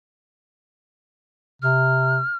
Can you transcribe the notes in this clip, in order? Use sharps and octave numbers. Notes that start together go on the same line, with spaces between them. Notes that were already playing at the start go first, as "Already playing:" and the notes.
C3 F6